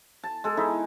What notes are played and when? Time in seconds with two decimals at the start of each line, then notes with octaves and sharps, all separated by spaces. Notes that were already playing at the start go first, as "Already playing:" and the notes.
0.23 A5
0.44 G#3 A4
0.57 D#4 E4 G#4